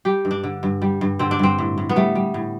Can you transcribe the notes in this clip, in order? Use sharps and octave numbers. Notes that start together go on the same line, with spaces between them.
G3 G4
G2
D4
D3
G2
G3
G2
D3 C4
D4
G2 C4
A2
A2
B3
G3 A3
G3
A2